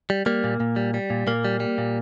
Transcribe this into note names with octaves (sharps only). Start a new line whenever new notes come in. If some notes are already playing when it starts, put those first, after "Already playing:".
G3
G3 A#3
A#2
A#2
G3
G3
A#2
A#2 A#3
G3
G3
A#2